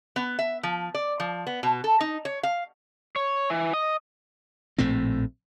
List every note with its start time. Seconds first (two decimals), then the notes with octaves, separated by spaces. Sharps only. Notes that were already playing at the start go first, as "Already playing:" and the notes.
0.16 B3
0.39 E5
0.63 F3
0.95 D5
1.20 F3
1.47 B3
1.63 B2
1.84 A4
2.01 D#4
2.25 C#5
2.43 F5
3.16 C#5
3.50 E3
3.74 D#5
4.78 A#1 A2 A3 C4